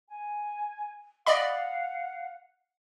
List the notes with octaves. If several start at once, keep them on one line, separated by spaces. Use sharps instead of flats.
G#5
D5 D#5 F5 F#5 B5